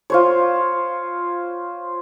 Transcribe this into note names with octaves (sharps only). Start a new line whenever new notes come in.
F4 C5 C#5